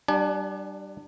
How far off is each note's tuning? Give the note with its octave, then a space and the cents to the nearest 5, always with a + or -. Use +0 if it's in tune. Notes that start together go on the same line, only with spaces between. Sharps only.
G3 -20 D4 +25 G#5 +45